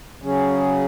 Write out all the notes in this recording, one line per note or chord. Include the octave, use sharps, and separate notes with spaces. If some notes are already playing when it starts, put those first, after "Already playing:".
C#3 F#3 C#4 G#4